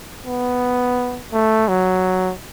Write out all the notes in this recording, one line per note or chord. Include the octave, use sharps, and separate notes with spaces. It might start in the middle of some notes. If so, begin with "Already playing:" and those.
B3
A3
F#3